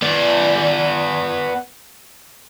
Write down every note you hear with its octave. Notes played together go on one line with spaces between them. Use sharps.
B3 D5